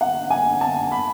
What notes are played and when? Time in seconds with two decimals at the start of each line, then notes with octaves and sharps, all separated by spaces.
0.01 F#5
0.30 G#5
0.61 A5
0.91 B5